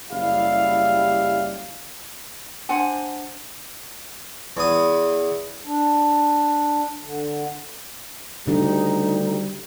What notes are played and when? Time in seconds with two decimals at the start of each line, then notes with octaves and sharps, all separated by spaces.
0.10 F#1 G3 E4 G4 F5
2.69 D4 C5 F#5 G#5
4.57 E2 D#6
5.66 D4
7.04 D3
8.47 D2 C#3 F#3 G3 D4 D#4